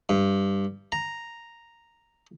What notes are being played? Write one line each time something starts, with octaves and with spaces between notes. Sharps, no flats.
G2
A#5